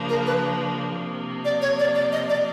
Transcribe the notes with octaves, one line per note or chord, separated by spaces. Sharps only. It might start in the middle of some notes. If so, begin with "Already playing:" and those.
Already playing: C#3 F3 A#3 D4
A#4
B4
C3 F3 A#3
D5
C#5
D5
D5
D#5
D5